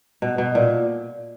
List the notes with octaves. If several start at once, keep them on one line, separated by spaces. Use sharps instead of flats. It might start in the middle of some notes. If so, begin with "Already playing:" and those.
B2
B2
A#2